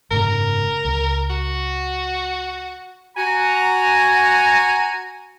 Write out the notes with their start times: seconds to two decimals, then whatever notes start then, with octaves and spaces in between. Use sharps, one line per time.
0.11 F#1 G#2 C#3 A#4
0.85 C#2
1.30 F#4
3.17 F#4 G#5 A#5